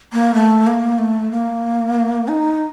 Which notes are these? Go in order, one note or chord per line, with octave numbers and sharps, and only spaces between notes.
A#3
A3
A#3
A3
A#3
D#4